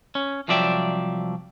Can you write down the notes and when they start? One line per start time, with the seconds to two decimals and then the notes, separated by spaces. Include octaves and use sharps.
0.15 C#4
0.48 C2 F3 F#3 D5 E5 G5